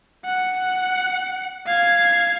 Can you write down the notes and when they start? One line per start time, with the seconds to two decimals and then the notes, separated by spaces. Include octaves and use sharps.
0.25 F#5
1.67 F5 G#6